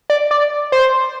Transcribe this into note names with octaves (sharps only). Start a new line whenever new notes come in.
D5
D5
C5